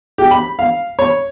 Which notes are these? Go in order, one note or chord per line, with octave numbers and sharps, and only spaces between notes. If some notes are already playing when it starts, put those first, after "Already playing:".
G4
B5
F5
C#5